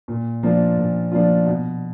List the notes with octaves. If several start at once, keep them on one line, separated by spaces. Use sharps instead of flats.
A#2
F3 A#3 D4 F4
A#2
F3 A#3 D4 F4
B2